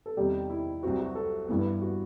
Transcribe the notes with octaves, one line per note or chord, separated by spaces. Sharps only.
A4
E2 C3 D#3 G3 G4
E4
C2 C3 F#3 C4 F#4
F#4
A4
G2 E3 B3
F#4